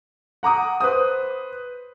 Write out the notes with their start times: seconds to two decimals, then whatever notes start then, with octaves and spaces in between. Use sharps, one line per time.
0.43 F#5 A#5 D6 D#6
0.81 B4 C5 D#6